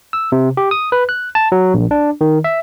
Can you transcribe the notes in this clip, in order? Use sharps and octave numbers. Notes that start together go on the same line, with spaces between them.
E6
C3
G4
D#6
B4
F#6
A5
F#3
A#1
D4
D#3
E5